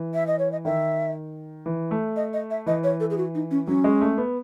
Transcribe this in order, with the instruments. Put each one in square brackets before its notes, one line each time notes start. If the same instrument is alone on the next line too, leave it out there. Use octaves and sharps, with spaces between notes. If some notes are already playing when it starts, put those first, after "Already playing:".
Already playing: [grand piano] E3
[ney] E5
D#5
C#5
D#5
[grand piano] D#3 [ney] E5
[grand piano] E3
A3
[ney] D#5
D#5
E5
[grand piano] E3 [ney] D#5
[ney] C#5
A4
G#4
F#4
D#4
C#4
[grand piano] F#3 [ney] C#4
[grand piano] G#3
A3
B3